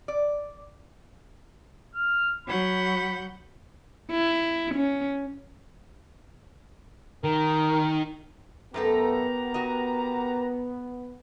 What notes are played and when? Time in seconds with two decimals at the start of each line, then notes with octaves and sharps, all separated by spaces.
0.08 D5
1.95 F6
2.47 F#3 F#5 B5 G6
4.11 E4
4.74 C#4
7.24 D#3 A#4
8.74 F#2 A3 B3 G4 A4 A#4 A#5
9.54 F#4 D#5